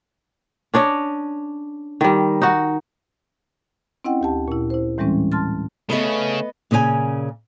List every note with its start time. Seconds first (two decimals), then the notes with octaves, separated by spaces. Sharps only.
0.74 C#4 D4 C#5 D#5
2.01 D#3 G3
2.42 D#4 F#4
4.04 C4 C#4 E4 D#5 F#5 G5
4.21 D2 G4 A5
4.48 A#2 E4
4.70 E4 C5
4.98 A2 E3 G3 G#3 C4 C#4
5.32 A5 C6 F6 A6
5.90 C#3 A3 B3 C#4 B4 D#5
6.71 A#2 C#3 C#4 B4 G#5